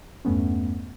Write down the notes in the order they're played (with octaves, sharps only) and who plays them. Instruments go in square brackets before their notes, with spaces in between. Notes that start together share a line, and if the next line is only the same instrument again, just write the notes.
[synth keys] E2 G2 A3 B3 C#4